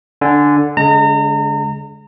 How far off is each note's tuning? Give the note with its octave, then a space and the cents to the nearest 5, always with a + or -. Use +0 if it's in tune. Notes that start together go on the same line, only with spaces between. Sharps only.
D3 +0 G#5 +0
D3 -45 G#3 +0 A#5 -35